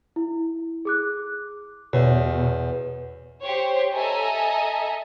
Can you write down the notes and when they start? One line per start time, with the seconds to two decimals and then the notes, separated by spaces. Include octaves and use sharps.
0.16 E4
0.85 G#4 D6 F#6
1.93 E2 B2 C#5
3.41 G4 C5 C#5
3.95 A4 D#5 E5 G#5 A#5